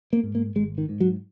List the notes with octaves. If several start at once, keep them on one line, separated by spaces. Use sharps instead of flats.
A#3
G#2
A#3
G#1 G#3
D#3
G#2
F#3